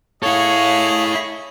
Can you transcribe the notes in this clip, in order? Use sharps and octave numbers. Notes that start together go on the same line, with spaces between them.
E4 G#4 A4 C#5 D#5 F5